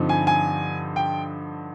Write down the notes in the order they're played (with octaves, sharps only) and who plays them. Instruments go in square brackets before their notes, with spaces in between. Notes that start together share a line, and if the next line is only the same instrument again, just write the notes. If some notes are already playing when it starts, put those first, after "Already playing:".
Already playing: [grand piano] G2 D3 F3 C4 D#4
G#5
G#5
G5